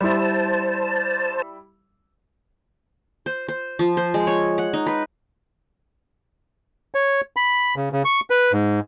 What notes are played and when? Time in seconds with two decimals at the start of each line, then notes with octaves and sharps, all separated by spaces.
0.01 G3 E4 C5 A5
3.26 C5
3.48 C5
3.79 F3
3.97 C5
4.14 G#3
4.27 C#5
4.58 F#5
4.73 D#4
4.87 B4
6.95 C#5
7.37 B5
7.76 C#3
7.93 C#3
8.05 C#6
8.30 B4
8.52 G#2